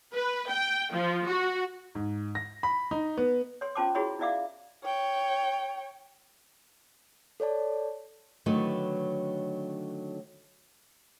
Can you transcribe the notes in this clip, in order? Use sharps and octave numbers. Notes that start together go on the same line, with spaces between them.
B4
G5
F3
F#4
G#2
A#6
B5
D#4
B3
C#5 C6
C#4 F4 C5 A5 C6 D6
E4 F#4 G#4 C#5 D#5 B5
D#4 E4 D5 E5 F5 D6
C#5 G5
A4 C#5 D5 A5
D3 D#3 F#3 A3 B4